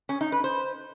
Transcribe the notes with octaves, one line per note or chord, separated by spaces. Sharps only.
C#4
D#4
B4
C5